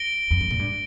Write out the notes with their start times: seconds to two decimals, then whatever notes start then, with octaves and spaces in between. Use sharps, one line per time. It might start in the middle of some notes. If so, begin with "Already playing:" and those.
Already playing: A#6 D7 G7
0.31 F2
0.40 G2
0.50 A#2
0.59 G2